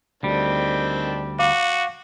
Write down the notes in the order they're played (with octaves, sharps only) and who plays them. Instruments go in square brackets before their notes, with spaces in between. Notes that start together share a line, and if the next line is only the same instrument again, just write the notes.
[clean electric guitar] D2 G3 [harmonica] D#3 C4 D4
[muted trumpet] F#4 [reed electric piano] F5 D6